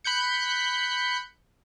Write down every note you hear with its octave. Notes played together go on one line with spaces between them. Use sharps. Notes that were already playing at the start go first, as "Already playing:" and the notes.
B5 F#6 G6 C#7